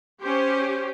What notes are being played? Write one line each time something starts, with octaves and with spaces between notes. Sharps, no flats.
C#4 G4 C5